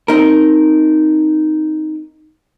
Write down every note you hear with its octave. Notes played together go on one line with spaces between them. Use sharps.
C4 D#4 A#4